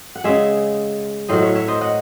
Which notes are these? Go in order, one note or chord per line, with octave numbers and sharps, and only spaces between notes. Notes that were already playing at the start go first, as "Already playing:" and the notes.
F#5
C#3 G#3 C#5 E5
A2 F#3 C5 D#5
C#5 E5
C#5 E5
C5 D#5
D#5 F#5